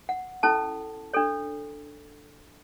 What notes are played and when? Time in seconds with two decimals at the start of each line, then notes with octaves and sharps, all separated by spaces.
0.09 F#5
0.43 C#4 E4 A4 A5
1.13 D4 A4 C#5